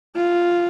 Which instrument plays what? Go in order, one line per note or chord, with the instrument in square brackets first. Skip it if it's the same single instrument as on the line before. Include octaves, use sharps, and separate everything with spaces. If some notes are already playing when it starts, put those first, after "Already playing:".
[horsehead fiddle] F4